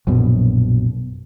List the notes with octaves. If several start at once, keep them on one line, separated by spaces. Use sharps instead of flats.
A#1 F#2 B2